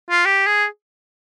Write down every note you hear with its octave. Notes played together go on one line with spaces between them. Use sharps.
F4
G4
G#4